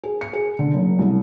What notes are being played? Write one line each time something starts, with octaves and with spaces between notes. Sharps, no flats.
G#4
C#7
G#4
D3
F#1
C2